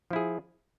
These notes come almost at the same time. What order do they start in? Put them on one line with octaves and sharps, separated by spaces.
F3 E4 G#4